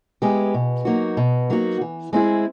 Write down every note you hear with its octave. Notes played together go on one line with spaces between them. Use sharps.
G#3 B3 E4 G4
B2
F#3 A#3 D#4 F#4
B2
F#3 A#3 D#4 F#4
E3
G#3 C4 E4 G#4